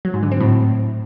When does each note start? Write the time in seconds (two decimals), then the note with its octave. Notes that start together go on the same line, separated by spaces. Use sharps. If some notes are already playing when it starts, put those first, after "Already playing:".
0.05 F#3
0.14 G#2
0.23 D3
0.32 C4
0.40 A2